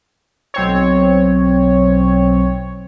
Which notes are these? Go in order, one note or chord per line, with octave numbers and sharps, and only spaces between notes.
B1 C4 C#5